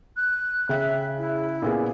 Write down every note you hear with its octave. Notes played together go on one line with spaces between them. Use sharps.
F#6
C#3 E5 G5 F#6
E4
A#2 B3 G#4